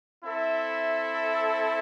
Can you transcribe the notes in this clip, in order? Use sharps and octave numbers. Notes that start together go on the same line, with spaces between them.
C4 E4 A4 E5